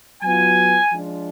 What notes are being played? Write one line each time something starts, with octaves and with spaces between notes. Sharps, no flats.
F#3 B3 F4 G#5
F3 G#3 D4 F4